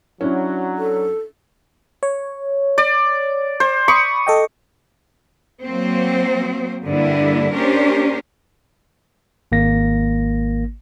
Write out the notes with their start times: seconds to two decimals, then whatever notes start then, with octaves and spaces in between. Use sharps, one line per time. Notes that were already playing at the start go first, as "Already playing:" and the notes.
0.21 F#3 C#4 D4 E4
0.78 A4
2.03 C#5
2.78 D5
3.60 C5
3.88 B5 C#6 D#6
4.27 A4 D#5 G5
5.63 F#3 A#3 C4 C5
6.85 G2 D3 A#3 D4 E4
7.53 A#3 C#4 D4 G4 A#4 C5
9.52 G#1 A#3 A#6